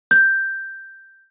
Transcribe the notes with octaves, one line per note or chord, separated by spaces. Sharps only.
G6